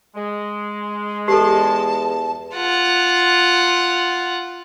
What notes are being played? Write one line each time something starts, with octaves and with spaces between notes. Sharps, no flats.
G#3
E2 G4 A4 A5
F4 F#5